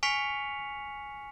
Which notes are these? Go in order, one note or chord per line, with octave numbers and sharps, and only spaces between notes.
G#5 C#6 F6 B6 C#7 F7